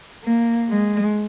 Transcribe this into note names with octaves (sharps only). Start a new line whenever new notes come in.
A#3
G#3